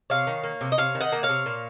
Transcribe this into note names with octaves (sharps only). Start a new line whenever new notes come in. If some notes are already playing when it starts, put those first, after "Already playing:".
C3 C#5 F5
D#3
A#3
C3
D#5
C3 C#5 F5
D#3
D#5 F#5
A#3
C#5 F5
C3
A#2